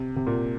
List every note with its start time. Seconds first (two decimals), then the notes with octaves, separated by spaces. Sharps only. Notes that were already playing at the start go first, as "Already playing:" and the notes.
Already playing: C3
0.16 C3
0.27 A#2